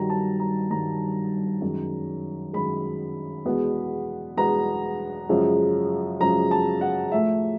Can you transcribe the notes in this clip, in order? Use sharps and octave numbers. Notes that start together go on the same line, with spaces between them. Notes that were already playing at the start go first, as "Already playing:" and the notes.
Already playing: G2 D#3 F#3 A#5
A5
A#5
G2 D#3 F#3 A#5
F#2 D#3 G#3
F#2 D#3 G#3 B5
E2 B2 G#3 B3
E2 B2 G#3 B3 A#5
F#2 C#3 F3 G#3
F#2 C#3 F3 G#3 A#5
A5
F#5
A2 F3 A3 E5